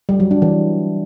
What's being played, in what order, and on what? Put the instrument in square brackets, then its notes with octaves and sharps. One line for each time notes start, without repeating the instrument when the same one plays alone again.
[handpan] G3
F#3
D4
E3